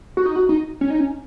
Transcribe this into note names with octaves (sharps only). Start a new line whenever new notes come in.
F#4
D#4
F#4
D#4
C#4
D#4
C#4